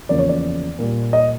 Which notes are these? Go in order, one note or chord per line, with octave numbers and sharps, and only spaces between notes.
E2 C#3 F3 A#3 D5
C#5
D5
A#2 G3 A#3
D#5